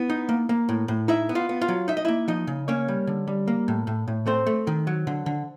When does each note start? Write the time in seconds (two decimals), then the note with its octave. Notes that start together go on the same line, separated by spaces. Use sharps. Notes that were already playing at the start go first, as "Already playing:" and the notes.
Already playing: B3 E4
0.10 D#4
0.29 A#3
0.49 A#3
0.69 A2
0.88 A2
1.08 D#4 E4 E5
1.29 B3
1.35 F4 F5
1.49 B3
1.61 F4 F5
1.68 F#3
1.88 D#4 E5
1.97 D#5
2.05 A#3 E4 E5
2.28 F3 D#4 D#5
2.47 C#3
2.68 A#3 C#4 C#5
2.88 G3
3.07 D3
3.28 G3
3.48 A#3
3.68 A2
3.87 A2
4.08 A2
4.26 A3 C4 C5
4.47 A3
4.67 D#3
4.87 F#3
5.07 D3
5.26 D3